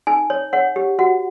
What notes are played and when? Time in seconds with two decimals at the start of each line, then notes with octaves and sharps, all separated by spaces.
0.07 D#4 G#5
0.30 C#5
0.53 C#5 F#5
0.76 G4
0.99 F#4 F#5